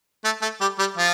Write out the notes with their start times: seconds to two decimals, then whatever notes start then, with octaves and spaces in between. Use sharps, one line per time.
0.24 A3 A4
0.42 A3 A4
0.61 G3 G4
0.79 G3 G4
0.97 F3 F4